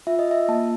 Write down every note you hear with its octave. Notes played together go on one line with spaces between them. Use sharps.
F4 E5
D#5
E5
A#3 A5